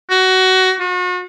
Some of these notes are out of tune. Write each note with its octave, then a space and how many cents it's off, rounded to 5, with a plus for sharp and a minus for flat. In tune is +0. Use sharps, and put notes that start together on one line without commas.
F#4 +20
F#4 -40